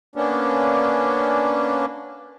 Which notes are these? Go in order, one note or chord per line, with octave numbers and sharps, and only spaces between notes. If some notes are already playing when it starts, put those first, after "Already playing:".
A#3 B3 C#4 D4